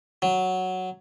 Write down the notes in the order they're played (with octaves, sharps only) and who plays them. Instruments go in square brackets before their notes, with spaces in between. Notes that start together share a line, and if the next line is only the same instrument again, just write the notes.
[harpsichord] F#3